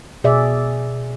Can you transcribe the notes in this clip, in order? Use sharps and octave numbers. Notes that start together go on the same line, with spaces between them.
B2 G#4 D5 E5